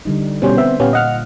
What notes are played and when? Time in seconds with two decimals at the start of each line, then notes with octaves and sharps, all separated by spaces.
0.05 D3 G3 D#4
0.42 B2 G3 C#4 C5
0.57 B3 C4 E5
0.80 A#2 B3 C#4 G4 F5
0.93 D#5 F#5 F6